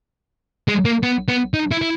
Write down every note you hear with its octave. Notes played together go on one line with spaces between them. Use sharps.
G#3
A#3
B3
B3
D#4
E4
E4